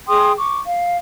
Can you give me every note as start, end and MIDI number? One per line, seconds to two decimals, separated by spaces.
0.08 0.31 68
0.08 0.31 79
0.08 0.31 84
0.08 0.31 87
0.37 0.60 85
0.37 0.60 86
0.66 0.96 77